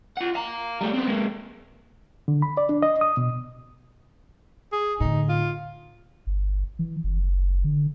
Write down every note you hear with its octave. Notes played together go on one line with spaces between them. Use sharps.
F4 F#5
F5 A#5
G3 A3
B3 C4
G#3 A#3
D3
B5
D5
D4
D#5
D#6
B2
G#4
A2 D3 D#4
F4
G1
E3
F#1
D3